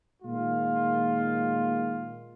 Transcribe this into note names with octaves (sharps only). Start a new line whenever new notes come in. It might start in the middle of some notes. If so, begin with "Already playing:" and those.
A#2 D#3 G#3 F4